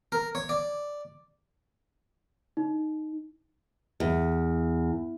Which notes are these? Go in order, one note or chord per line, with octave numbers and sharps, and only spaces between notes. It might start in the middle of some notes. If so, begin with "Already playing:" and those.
A#4
C#5
D5
D#4
E2